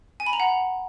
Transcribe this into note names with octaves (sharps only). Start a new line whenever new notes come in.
G#5
B5
A#5
F#5